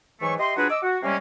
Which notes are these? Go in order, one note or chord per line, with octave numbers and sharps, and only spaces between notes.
G#2 E3 F#3 A3 C#5 C#6
G4 D#5 E5 C6
F#3 D4 F4 F#4 G#4 B4
D#5 D6 E6
F#4
C3 G3 G#3 A#3 C#4